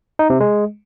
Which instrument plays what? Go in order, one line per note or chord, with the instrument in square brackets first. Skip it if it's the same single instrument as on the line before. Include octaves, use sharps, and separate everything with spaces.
[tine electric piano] D#4
C3
G#3